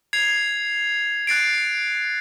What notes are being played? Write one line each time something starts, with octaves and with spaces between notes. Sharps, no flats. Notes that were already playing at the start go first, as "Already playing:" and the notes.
G#6 C7 F7
F#6 A6 C7 D7